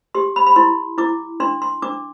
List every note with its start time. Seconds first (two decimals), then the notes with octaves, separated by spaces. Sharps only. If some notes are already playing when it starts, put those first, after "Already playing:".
0.15 G4 C6
0.36 B5
0.47 B5
0.56 E4 C6
0.98 E4 D6
1.40 D4 C6
1.62 C6
1.82 D4 D6